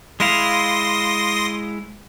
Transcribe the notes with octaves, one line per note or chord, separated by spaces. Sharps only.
G#3 E4 F5 C6 D#6 A#6